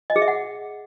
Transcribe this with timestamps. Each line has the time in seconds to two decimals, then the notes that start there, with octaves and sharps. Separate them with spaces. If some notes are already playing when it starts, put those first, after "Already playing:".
0.10 D#5
0.16 G#4
0.22 E5
0.28 F#5